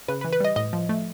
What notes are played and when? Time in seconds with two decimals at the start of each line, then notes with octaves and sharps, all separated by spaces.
0.08 C#3 B4
0.21 B4
0.25 E3
0.33 B4
0.40 G3 D#5
0.56 A2 D#5
0.73 F3
0.89 A3